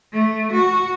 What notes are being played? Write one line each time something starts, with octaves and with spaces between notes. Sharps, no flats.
A3
F#4